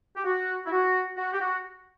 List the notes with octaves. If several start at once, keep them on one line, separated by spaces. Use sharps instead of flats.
G4
F#4
E4
F#4
F#4
G4
F#4